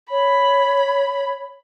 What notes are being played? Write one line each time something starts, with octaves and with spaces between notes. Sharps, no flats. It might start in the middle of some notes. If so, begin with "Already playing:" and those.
C#5 B5